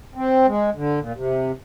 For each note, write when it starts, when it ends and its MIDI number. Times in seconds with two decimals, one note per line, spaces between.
0.15 0.46 60
0.47 0.70 56
0.75 0.99 50
1.00 1.12 46
1.15 1.52 48